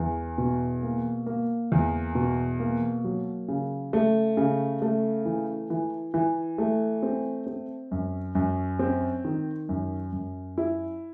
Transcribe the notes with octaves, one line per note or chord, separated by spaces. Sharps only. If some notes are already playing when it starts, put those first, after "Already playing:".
Already playing: E2
B2
A#3
A#3
E2
B2
A#3
F#3
C#3
A3
C#3
A3
E3
E3
E3
A3
C4
C4
F#2
F#2
C4
D#3
F#2
F#2
E4